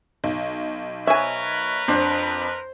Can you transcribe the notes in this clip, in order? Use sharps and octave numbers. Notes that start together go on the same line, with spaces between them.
B1
A#4 B4 C#5 E5 G#5
F2 D4 C5